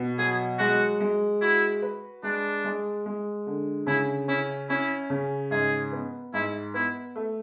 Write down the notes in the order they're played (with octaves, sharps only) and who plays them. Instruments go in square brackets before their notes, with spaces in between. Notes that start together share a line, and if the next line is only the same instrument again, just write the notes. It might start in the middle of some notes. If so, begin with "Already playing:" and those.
Already playing: [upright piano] B2 B3
[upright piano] F#3 [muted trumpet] G#4
[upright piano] G#3 [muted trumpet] F#4
[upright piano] G#3
[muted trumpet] E4 [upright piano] F#4
[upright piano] B4
[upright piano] G#3 [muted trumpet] D4
[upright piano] G#3
G#3
D3
[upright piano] C#3 [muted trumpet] E4
[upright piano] C#4 [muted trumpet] E4
[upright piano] C#4 [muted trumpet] E4
[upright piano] C#3
[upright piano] G#2 [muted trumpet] G#4
[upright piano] B3
[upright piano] G#2 [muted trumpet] E4
[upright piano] B3 [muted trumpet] E4
[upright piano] A3